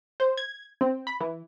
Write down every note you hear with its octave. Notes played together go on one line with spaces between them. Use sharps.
C5
G#6
C4
B5
E3